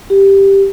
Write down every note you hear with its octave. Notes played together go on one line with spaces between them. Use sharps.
G4